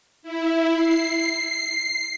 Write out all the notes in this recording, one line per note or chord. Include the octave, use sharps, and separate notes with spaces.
E4
C7